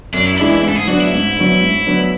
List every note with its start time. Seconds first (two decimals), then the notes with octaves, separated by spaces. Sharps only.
0.14 F#2 D4
0.26 E4
0.38 E3 G#3 D4 E4
0.51 E4
0.63 G#2
0.68 A4
0.75 G#4
0.87 F#3 B3 D4 F#4
1.00 E4
1.12 G#2
1.36 F#3 B3 D4
1.61 G#2
1.86 F#3 B3 D4